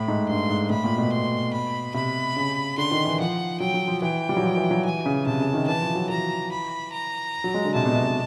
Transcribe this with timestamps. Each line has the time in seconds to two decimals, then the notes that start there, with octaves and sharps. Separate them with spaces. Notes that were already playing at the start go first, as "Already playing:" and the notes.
Already playing: A2 B5
0.08 G#2
0.28 G2 C6
0.50 G#2
0.70 A2 B5
0.84 A#2
0.98 B2
1.12 C6
1.53 B5
1.94 C3 B5
2.36 C#3
2.77 D3 C6
2.91 D#3
3.05 E3
3.19 F3 F#5
3.60 F#3 G5
3.74 F#3
3.88 F3
4.02 E3 G5
4.29 G3
4.37 F#3
4.43 F3
4.57 E3
4.71 F#3
4.85 E3 G#5
5.06 C#3
5.26 C3 A5
5.40 C#3
5.54 D#3
5.67 E3 A5
5.82 F3
5.95 F#3
6.09 E3 A#5
6.51 B5
6.92 A#5
7.44 F#3
7.54 G#3
7.65 D3
7.75 C3 A5
7.85 B2
7.96 C3
8.06 B2